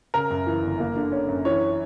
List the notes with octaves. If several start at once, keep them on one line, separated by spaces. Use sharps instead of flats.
C#3 A#4
F#2
E3
G1
A#3
D3
C#4
F#2
E3 C#5